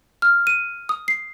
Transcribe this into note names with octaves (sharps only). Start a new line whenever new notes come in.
F6
D#7
D#6
C7